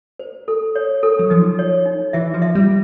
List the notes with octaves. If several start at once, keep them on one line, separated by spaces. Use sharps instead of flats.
C5
A4
C#5
A4
F#3
F3 D#4
C#5
D#4
E3 E5
F3
E5
G3